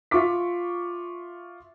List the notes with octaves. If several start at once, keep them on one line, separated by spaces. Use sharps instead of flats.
F4 E5 C#6 D6 B6